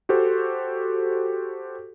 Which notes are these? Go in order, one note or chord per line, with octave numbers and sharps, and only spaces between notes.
F#4 G4 A4 C5